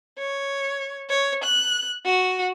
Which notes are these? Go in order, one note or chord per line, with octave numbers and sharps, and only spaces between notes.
C#5
C#5
F#6
F#4